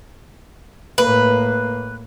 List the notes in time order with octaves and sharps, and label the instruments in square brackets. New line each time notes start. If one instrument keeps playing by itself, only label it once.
[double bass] A2 A#3 [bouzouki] B4